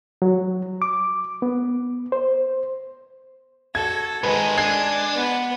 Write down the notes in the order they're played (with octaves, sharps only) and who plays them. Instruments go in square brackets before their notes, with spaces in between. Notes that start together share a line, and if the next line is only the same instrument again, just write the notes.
[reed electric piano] F#3
D6
B3
C5
[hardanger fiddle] F#4 A4 [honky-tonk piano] G#6
[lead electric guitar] G#2 D#3 [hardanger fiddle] G#3 [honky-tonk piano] B4
[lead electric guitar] D4 [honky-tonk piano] G#6 C7
[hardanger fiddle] B3